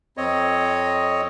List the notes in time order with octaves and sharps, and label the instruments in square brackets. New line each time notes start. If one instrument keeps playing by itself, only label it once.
[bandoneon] F2 C4 C#5 D#5